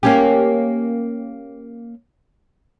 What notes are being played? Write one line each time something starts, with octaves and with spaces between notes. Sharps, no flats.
A#3 C#4 G4